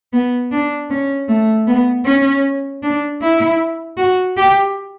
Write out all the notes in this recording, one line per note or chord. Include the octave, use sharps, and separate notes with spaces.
B3
D4
C#4
A3
B3
C#4
D4
E4
F#4
G4